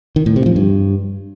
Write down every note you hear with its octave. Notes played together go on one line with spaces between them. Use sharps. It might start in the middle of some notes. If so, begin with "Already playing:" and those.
D#3
A2
C3
F3
G2